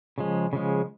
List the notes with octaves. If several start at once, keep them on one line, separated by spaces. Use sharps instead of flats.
C#3 F3 G#3
C#3 F3 G#3